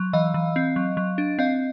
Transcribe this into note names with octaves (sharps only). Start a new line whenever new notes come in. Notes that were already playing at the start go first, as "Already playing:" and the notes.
Already playing: F#3
E3 D#5 F5
E3
C4
F#3
F#3
D4
C4 D#5 F5